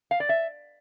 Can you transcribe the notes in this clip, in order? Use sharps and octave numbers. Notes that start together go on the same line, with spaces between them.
F5
D5
E5